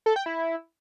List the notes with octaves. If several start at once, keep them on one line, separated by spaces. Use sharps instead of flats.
A4
G5
E4